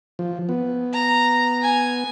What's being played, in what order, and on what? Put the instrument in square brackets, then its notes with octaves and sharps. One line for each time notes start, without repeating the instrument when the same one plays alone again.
[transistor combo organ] F3
B3
[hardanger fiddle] A#5
G#5